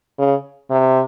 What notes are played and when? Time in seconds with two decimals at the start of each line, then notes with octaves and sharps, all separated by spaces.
0.19 C#3
0.71 C3